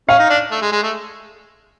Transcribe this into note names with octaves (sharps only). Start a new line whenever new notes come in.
C#4 F5
D#4
D4
A3
G#3
G#3
A3